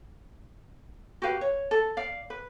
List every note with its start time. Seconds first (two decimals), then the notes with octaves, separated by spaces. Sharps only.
1.22 F#4 G4 B4 F5
1.41 C#5
1.71 A4
1.97 D5 F5
2.30 B4